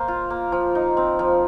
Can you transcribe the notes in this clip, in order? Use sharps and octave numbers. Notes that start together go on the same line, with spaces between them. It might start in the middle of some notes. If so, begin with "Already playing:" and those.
Already playing: A#3 C5
F4
A#3
F3
D#4
C4
F3